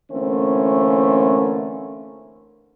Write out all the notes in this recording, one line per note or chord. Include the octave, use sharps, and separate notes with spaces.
D3 E3 A3 A#3 C4 C#4